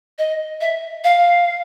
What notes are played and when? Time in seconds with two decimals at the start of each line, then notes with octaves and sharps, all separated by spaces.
0.19 D#5
0.61 E5
1.04 F5